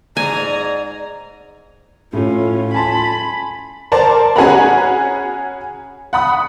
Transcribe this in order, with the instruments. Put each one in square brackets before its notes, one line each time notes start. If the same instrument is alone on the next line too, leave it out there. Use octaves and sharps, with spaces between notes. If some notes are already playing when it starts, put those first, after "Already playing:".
[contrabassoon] G#2 [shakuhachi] D5 [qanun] G#5 [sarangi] A#5
[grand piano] A2 [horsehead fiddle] C#4 F4
[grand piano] G#5 A5 C6 [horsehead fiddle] B5
[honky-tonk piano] A#4 C5 D5 A5 C6
C#4 F#4 G#4 F#5 A#5 B5
F#5 B5 D#6